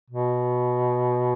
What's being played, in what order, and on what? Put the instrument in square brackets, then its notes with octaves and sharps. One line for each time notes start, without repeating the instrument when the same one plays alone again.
[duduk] B2